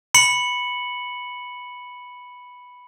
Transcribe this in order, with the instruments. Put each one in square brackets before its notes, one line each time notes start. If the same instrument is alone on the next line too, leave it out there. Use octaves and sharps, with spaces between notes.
[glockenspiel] B5 C#7 F#7